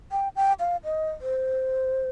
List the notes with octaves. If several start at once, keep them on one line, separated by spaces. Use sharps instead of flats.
G5
G5
F5
D#5
C5